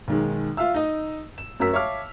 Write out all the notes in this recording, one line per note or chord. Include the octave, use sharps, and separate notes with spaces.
B1 D#3 G#3
F4 E5 F5 E6
D#4 D#5
E7
F#2 C#4 F#4 A#4 E6 B6
C#5 E5 F5 A5 D6 F6